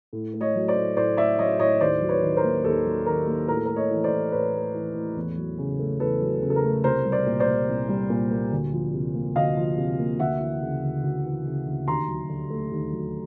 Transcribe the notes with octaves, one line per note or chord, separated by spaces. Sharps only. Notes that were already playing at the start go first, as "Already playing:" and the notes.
A2
A3
C#5 D#5
F#3
C5 D5
A2
A2 C5 D5
A3 D5 E5
F#3 C#5 D#5
A2 C#5 D#5
D#2 C5 D5
F#3
B4 C#5
D#3
A#4 C5
A#3
D#2 A4
F#3
D#3 A#4
A#3
A2 A#4
A4
A#4
A3
C#5 D#5
E3
C5 D5
A2
A2 B4 C#5
A3
E3
A2
E2
F#3
C#3
A3
E2 A4 B4
F#3
C#3
A4
A#4
A3
C2 A#4 C5
G3
C5 D5
A#2
C5 D5
A#3
C2
G3
A#2
A#3
D2
F3
C3
A#3
D2 D#5 F5
F3
C3
A#3
D2 E5 F#5
E3
C#3
D2
D2
E3
C#3
D2
D#2 A#5 C6
F#3
D3
A3
D#2
F#3